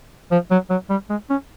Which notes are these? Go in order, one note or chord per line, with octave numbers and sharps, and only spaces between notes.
F3
F#3
F#3
G3
G#3
C#4